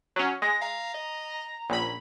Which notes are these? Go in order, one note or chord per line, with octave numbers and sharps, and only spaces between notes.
F#3 C#4
G#3 A#6
F5 A#5
D#5
A#1 C#4 B5